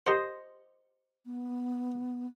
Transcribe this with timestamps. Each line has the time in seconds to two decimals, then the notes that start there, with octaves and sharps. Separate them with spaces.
0.06 G4 A#4 C5 D#5 F#5
1.26 B3